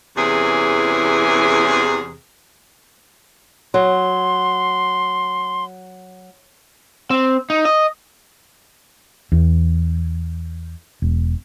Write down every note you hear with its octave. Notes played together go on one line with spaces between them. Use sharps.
E2 C3 E3 C#4 G#4
F#3 C6
C4
D#4
D#5
E2
E1